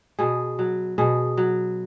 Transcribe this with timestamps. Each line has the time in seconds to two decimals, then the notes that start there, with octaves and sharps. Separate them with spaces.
0.19 B2 G#4
0.59 F#3
0.98 B2 G#4
1.37 F#3